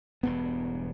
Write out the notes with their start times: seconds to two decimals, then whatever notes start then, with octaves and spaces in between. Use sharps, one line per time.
0.23 E1 G2 B3